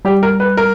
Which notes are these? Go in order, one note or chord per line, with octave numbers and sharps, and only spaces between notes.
G3 G4
A#4
B4
A#4